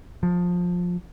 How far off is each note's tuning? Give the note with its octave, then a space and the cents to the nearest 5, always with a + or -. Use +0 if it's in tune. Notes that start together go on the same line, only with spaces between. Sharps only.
F3 +20